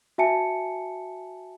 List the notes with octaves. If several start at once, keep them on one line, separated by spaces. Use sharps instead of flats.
F#4 E5 G#5 A5 C#7